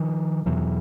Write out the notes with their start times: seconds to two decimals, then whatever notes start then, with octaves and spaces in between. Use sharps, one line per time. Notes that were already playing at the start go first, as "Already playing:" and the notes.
Already playing: D#3 F3
0.46 E2 B2 E3 F#3